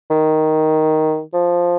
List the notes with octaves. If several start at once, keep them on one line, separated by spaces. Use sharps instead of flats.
D#3
F3